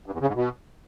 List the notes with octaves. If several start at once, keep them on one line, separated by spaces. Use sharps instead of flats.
G2
E2
C#3
G#2
B2